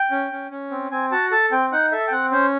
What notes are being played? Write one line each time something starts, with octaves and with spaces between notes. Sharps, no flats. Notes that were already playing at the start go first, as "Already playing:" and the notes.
Already playing: G5
C#4
C#4
C#4
C4
C4 G#5
F#4 A5
A4 A5
C4 G5
D#4 F#5
A4 E5
G5
C4 F#5
C#4 C5